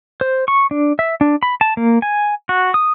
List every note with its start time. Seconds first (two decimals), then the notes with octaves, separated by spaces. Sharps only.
0.21 C5
0.48 C#6
0.71 D4
0.99 E5
1.21 D4
1.43 B5
1.61 A5
1.77 A#3
2.02 G#5
2.49 F#4
2.74 D#6